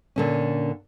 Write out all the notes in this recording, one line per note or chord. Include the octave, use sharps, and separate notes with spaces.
A#2 D3 C#4